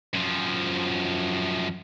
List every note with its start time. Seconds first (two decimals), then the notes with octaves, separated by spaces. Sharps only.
0.13 F#2 F3